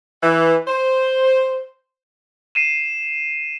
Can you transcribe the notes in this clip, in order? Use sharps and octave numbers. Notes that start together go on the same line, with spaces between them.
E3
C5
C7 D#7 E7